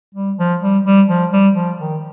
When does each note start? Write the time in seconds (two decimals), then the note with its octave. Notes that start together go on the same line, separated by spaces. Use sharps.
0.15 G3
0.39 F3
0.62 G3
0.85 G3
1.09 F3
1.33 G3
1.55 F3
1.79 D#3